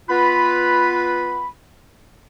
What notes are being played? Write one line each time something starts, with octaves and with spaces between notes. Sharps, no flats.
B3 F4 B4 B5